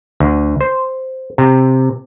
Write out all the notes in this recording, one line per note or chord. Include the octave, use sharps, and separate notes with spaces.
D2
C5
C3